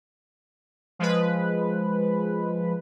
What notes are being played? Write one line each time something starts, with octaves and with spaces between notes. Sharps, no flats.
F3 G#3 B4